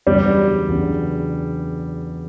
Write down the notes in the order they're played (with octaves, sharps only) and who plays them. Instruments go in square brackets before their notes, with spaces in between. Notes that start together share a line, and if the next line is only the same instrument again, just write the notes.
[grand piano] E2 C#3 F#3 B3 D4 [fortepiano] G3
[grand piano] E2 C#3 F#3 B3 D4